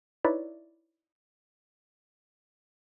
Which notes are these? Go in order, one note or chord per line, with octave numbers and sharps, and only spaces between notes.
D#4 E4 B4 C#5 D5 E5